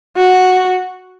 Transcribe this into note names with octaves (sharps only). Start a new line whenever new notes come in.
F#4